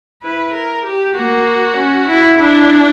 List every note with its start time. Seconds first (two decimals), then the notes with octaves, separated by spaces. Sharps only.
0.23 E4 B4
0.54 A#4
0.85 G4
1.16 A#3 F#4
1.77 C#4
2.08 E4
2.38 D4 E4